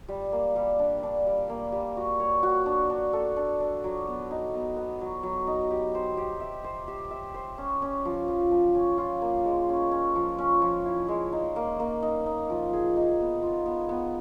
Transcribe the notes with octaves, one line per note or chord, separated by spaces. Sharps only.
G3
A#3
G3
D4
D4
G3
A#3
G3
F#4
C#5
F#4
D4
D4
A4
D4
D4
F#3
B3
D#4
B3
B3
F#3
F#3
D#4
G4
C5
G4
E5
C5
G4
E5
C5
C#4
C#4
F3
F3
F3
C#4
F4
A#3
G#3
C#4
C#4
F3
C#4
F3
E4
G#3
D#4
A#3
A#3
D#4
D#4
F3
G#4
D#4
B3
F4
B3
B3